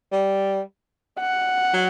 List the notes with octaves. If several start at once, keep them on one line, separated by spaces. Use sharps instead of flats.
G3
F#5
F#3